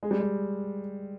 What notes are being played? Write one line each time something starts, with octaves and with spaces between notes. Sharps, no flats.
G#3
G3
G#3